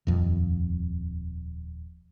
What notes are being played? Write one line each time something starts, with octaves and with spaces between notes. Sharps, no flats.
D#1 F2